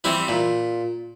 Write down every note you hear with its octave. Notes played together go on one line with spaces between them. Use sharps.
E3 G3 C4 E4
A#2